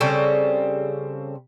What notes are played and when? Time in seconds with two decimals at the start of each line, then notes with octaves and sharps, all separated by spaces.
0.01 C#3 G3 C4 A4